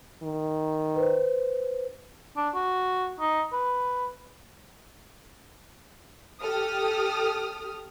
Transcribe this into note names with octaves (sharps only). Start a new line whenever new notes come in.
D#3
B4 C5
D4
F#4
D#4
B4
G4 A4 D#6 F6